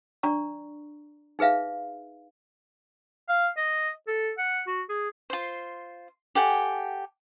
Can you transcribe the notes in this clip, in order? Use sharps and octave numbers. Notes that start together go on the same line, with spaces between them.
D4 D5 A#5 C#6
D#4 G#4 B4 E5 F5
F5
D#5
A4
F#5
F#4
G#4
F4 C5
G4 A4 F#5 G#5